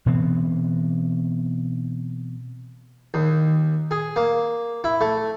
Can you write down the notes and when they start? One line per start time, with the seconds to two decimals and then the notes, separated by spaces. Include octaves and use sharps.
0.06 B2 E3 B3 C4
3.14 D#2
3.91 G#4
4.16 A#3
4.84 E4
5.01 A3